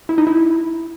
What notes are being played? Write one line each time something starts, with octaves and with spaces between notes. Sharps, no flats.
E4
D#4
E4